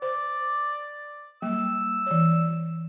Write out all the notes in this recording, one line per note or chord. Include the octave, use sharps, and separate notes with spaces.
C5 D5
F#3 G3 A#3 E6
E3 C#5